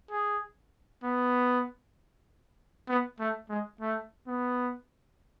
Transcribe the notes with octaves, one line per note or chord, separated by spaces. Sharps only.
G#4
B3
B3
A3
G#3
A3
B3